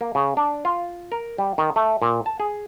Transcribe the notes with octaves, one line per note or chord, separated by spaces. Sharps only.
A#3
C#3
D4
F4
A#4
G3
D#3
A3
A#2
A5
G#4